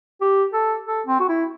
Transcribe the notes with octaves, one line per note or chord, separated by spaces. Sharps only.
G4
A4
A4
C4
F#4
E4